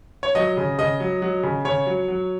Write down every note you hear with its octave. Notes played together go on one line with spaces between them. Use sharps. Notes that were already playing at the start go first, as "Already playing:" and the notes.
C#5
F#3 D#5
C#3
C#3 D#5
F#3
F#3
C#3
C#3 C#5
F#3
F#3